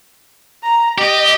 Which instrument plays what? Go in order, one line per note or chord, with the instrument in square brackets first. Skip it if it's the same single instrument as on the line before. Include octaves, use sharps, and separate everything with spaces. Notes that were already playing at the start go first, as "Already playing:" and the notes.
[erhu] A#5
[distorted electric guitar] G4 [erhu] D#5